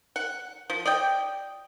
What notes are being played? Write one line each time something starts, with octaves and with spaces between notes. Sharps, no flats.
F#5
F3
D5 D#5 G5